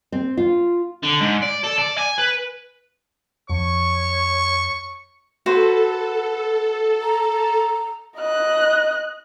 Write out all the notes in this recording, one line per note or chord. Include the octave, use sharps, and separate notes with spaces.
C4
F4
D3
G#2
D5
A4
D5
G#5
B4
F2 C#5 C#6
F#4 A4 B4 C5
A#5
D#5 F#6